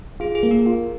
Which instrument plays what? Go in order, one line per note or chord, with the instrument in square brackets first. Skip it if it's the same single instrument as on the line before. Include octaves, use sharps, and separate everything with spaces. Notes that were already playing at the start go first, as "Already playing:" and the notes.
[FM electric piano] F4 [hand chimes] G#4
[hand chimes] G#4
[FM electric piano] A#3
[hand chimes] A#4
[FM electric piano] F4